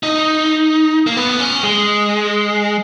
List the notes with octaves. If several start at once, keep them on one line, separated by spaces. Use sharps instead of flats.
D#4
A#3
B3
C#4
G#3